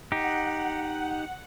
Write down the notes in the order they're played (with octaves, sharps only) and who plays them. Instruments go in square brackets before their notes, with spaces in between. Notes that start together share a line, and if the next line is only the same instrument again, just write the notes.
[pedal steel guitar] D#4 G4 [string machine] F#5